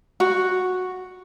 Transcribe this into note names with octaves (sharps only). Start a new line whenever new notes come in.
F#4